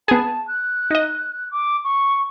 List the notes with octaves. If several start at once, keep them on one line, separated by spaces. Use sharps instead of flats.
B3 G#4 A5
F#6
D#4 D#5
D6
C#6